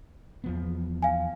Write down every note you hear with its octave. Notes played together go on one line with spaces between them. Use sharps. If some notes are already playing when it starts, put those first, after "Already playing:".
E2 F3 B3
F5 G#5